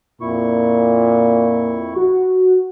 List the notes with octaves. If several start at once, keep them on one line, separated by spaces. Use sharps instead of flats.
F2 A#2 E4 C#6
F#4